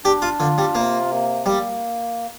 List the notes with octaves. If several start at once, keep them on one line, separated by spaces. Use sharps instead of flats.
D4 G4
F4
D3 F4
G3
C3 A#3
A#3
G3 A#3